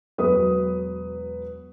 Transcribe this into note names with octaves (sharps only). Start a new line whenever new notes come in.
E1 F#3 B4 D#6